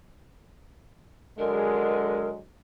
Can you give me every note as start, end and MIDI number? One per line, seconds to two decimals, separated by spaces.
1.39 2.41 50
1.39 2.41 54
1.39 2.41 56
1.39 2.29 70